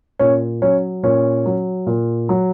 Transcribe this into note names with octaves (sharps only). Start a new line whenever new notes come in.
A#2 C#4
F#3 C#4
A#2 C#4
F#3
A#2
F#3